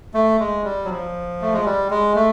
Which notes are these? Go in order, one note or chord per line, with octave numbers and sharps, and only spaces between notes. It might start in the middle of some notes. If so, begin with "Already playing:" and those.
A3
G#3
G3
F#3
F3
A3
G#3
G3
G#3
A3